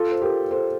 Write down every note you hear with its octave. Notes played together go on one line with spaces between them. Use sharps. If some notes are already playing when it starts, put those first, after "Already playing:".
Already playing: F4 A4
C5
G4 A#4
A4 C5